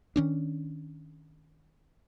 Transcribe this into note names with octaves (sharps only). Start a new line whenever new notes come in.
D#3 C#4 D4